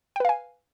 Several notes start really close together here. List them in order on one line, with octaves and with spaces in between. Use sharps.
G5 B4 F5 G#5